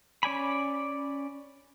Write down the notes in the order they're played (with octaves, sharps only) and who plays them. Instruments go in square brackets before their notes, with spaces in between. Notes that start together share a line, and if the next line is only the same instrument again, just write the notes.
[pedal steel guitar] C#4 D5 G#5 B5